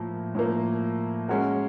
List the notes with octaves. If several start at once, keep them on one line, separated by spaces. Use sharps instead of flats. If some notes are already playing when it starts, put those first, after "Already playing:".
Already playing: A2 F3 A#3
A2 F3 A#3
G#3 C#4 F#4 A#4